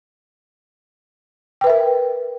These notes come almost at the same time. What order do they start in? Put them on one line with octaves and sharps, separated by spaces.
G5 B4 E5 A#4